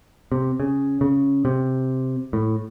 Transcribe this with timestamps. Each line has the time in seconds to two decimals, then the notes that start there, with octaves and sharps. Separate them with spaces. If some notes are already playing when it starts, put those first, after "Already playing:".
0.32 C3
0.60 C#3
1.01 C#3
1.45 C3
2.33 A2